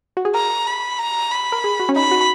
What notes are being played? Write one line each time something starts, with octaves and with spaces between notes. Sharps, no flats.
F#4
G#4
A#4 A#5
B5
A#5
B5
A#4
G#4
F#4
C#4
D#4 B5
F#4